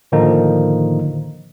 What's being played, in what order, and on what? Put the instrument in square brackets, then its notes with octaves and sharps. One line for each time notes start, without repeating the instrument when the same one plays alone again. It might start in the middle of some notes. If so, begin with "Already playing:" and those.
[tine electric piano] A2 D3 D#3 F3 A#3 D#4